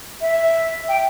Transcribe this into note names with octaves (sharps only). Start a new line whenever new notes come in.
E5
G5